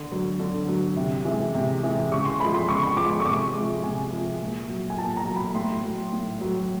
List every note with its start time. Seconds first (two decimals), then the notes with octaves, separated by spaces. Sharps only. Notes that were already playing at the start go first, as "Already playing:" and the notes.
Already playing: D3
0.12 F#3
0.40 D3
0.68 F#3
0.97 C3
1.25 E3 G#3
1.54 C3
1.83 E3 G#3
2.11 C#3 C#6
2.25 C6
2.40 F3 G#3 B5
2.54 C6
2.69 C#3 C#6
2.83 B5
2.97 F3 G#3 D6
3.20 C#6
3.25 C3 D6
3.54 G#3
3.59 F3
3.84 C3 G#5
4.12 F3 G#3
4.40 A#2
4.69 F#3
4.90 G#5
4.97 A#2 A5
5.17 A#5
5.27 F#3
5.36 B5
5.55 A2 C6
5.83 F#3
6.12 A2
6.41 F#3